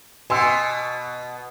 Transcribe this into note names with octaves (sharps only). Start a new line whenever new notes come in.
B2 G#5 C6 E6